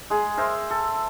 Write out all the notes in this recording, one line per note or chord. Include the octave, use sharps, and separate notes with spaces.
G#3 G#4
A#4 C5 E5
A4